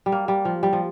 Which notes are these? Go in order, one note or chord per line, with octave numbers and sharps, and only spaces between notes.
G3
A#3
G3
F3
G3
F3